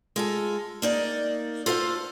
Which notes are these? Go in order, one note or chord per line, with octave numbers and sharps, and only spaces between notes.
G#3 F4 A4
A#3 D#4 D5
F4 A4 C5 D#5 F5